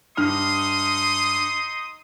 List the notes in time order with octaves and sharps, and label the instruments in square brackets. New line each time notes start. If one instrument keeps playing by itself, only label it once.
[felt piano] G2 F6 [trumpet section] D#4 C6 D#6